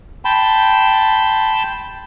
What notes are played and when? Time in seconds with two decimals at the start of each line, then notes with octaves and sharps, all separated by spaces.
0.25 G5 A5 B5 C6